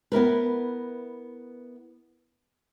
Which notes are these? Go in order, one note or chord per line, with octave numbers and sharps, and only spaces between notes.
B3 E4 A#4 B4